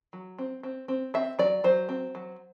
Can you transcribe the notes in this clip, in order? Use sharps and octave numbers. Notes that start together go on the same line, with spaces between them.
F#3
C4
C4
C4
C4 E5
F#3 D5
F#3 C5
C4
F#3